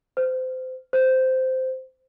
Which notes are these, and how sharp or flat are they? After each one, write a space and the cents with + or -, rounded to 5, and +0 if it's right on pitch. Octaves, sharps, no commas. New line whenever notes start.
C5 -25
C5 -10